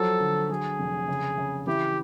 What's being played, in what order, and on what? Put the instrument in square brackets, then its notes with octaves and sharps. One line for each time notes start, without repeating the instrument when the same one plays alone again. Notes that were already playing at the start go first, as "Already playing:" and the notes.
Already playing: [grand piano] F3 F#3 [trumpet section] A4
[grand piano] D3
[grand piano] F#3 [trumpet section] G#4
[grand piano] F1
C#3
C#3
[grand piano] E3 [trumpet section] G4